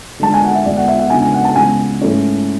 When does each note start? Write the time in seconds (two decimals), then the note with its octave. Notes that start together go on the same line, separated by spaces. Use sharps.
0.20 D3 G#3 D4 A5
0.34 G#5
0.44 F#5
0.54 E5
0.65 E2 D3 G#3 D5
0.77 F#5
0.88 E5
0.99 F#5
1.10 C#3 G#3 B3 D4 G#5
1.22 G#5
1.34 F#5
1.45 A5
1.56 C#3 E3 G#3 B3 G#5
2.01 G#2 E3 A3 C#4